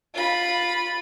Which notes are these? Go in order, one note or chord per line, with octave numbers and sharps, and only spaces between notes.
F4 B5